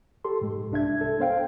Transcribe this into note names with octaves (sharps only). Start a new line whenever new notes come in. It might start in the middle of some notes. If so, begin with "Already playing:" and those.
G4 A4 C6
G#2 G#3
C2 D4 E5 G#6
A4
B3 C5 F5 G5